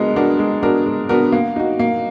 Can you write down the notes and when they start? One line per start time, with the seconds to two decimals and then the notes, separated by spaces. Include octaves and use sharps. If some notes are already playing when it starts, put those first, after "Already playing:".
Already playing: G#3 B3 D4 F#4 A#4
0.16 B3 D4 F#4 A#4
0.39 G#3
0.63 B3 D4 F#4 A#4
0.86 G#3
1.09 B3 D4 F#4 A#4
1.32 A#3
1.56 D#4 F#4
1.79 A#3